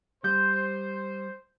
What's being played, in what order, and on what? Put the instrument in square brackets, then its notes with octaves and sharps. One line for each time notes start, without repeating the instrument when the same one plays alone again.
[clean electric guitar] G3 [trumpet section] C5 [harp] G6